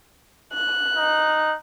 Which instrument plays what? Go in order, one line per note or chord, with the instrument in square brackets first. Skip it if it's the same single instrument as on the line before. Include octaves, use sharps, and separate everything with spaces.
[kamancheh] F#6
[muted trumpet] D#4